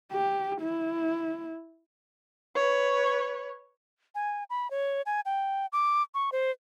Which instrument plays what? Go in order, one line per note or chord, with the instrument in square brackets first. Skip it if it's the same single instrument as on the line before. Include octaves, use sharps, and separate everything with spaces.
[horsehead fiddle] G4
E4
[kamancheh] B4 C#5
[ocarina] G#5
B5
C#5
G#5
G5
D6
C#6
C5